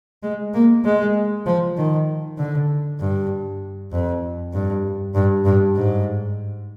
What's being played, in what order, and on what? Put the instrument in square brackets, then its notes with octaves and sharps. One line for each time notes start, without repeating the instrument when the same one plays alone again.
[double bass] G#3
A#3
G#3
F3
D#3
D3
G2
F2
G2
G2
G2
G#2